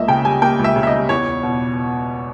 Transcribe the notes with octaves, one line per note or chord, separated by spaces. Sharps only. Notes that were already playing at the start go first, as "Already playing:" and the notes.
Already playing: C#2 A#3 D#5 E5
C#3 G5
G3 G#5
A#3 G5
C#2
E5
C#3
E5
D#5
G3
E2 C#5
E2
B2